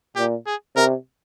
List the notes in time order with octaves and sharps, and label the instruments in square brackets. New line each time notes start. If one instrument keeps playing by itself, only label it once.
[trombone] A#2 [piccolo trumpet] G4
[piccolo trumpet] G#4
[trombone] C3 [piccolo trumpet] A#4